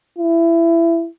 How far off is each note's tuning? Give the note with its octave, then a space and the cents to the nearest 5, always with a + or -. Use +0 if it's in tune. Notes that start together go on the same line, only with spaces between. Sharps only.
E4 +20